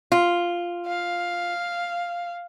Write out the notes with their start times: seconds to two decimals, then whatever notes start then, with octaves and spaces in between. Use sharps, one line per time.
0.12 F4
0.87 F5